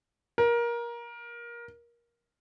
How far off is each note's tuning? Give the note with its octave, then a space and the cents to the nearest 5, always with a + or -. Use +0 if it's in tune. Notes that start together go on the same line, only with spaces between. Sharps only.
A#4 +20